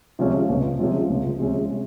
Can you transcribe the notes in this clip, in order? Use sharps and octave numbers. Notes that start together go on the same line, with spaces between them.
C3 F3 G#3 C#4
C#2
C3 F3 G#3 C#4
C#2
C3 F3 G#3 C#4